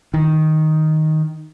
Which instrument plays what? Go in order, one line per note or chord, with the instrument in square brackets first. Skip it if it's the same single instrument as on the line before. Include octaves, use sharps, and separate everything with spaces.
[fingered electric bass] D#3